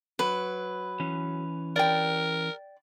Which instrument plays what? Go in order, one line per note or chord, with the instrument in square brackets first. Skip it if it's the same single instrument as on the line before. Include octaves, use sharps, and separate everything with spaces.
[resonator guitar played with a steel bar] F#3 [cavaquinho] B4
[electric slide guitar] E3 C#4
[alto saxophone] A#4 [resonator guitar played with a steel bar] D5 G5